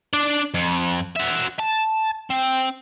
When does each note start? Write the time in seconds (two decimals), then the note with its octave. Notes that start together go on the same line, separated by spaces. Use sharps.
0.14 D4 D5
0.54 F2
1.16 F#4 E5
1.59 A5
2.30 C4